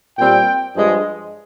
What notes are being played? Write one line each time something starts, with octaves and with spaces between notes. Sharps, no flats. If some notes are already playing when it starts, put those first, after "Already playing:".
A#2 G3 C4 G5
G2 F3 G#3